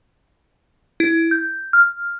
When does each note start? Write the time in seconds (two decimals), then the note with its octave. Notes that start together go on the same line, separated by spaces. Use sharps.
1.00 E4
1.31 G6
1.73 F6